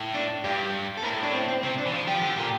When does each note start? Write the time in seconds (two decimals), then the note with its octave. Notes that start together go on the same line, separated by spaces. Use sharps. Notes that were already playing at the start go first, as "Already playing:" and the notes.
Already playing: A2
0.14 D4
0.44 G2 G4
0.97 A4
1.03 A2 A#4
1.23 D4
1.33 C4
1.48 C4
1.63 C3 C4
1.78 D4
1.85 E3
1.92 F3
2.07 F3 G4
2.21 D3
2.37 A#2